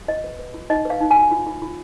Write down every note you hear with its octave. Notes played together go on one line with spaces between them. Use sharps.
F4 D#5
B4
B4
F4
D#4 D#5
B4 F5
D#4
G#5
F#4
F4
F4
F4